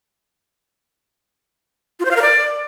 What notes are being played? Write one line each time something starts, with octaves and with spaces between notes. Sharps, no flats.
F4
C5
F5
A#4
D5